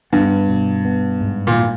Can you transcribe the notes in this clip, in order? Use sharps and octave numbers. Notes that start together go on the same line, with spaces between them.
G2 B3
B2
B3
G#2
A#2
A#3